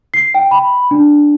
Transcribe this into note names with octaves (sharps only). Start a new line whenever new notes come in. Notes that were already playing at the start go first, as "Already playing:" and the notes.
C7
G5
B5
D4